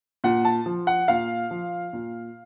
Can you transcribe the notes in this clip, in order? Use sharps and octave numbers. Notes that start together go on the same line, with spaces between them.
A#2 F#5
A5
F3
F#5
A#2 F5
F3
A#2